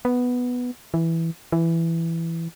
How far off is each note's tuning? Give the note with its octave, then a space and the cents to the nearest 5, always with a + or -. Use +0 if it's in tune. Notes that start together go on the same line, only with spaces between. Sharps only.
B3 +0
E3 +0
E3 +10